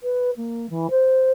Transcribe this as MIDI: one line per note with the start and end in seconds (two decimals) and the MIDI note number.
0.03 0.31 71
0.37 0.69 58
0.70 0.87 52
0.90 1.32 72